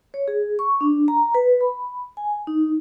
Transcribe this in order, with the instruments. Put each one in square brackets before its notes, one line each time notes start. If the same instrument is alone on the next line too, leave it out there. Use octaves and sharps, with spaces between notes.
[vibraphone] C#5
G#4
C#6
D4
A#5
B4
B5
G#5
D#4